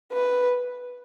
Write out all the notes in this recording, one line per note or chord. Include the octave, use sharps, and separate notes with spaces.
B4